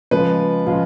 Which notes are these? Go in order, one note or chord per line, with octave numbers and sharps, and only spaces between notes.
C#3 F3 G#3 B4
C#3 F3 G#3 F4